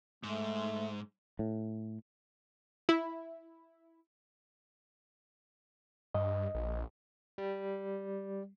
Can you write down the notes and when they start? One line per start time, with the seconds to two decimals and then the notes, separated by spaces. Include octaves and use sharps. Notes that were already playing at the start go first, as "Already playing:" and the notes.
0.24 G#2 A3
1.39 A2
2.89 E4
6.14 G2 D#5
6.55 A#1
7.38 G3